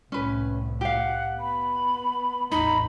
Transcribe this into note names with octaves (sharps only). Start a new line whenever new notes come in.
C2 A2 C#4 B4
G4 F5 F#5
B3 B5
A1 E2 D#4 A#5 B5